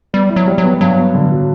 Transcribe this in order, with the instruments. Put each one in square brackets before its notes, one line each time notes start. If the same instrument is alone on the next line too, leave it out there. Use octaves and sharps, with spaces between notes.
[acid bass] G3 [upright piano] B3
[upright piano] E4
[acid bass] F#3
[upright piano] G3
[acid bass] F#3
[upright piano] B3
[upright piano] G2 [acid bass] F#3
[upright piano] B3
D3
F#3